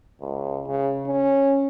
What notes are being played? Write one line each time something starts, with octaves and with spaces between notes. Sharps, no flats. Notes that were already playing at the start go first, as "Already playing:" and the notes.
C#2
C#3
C#4